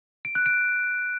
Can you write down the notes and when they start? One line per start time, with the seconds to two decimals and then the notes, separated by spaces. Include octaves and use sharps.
0.25 D7
0.35 F#6
0.46 D7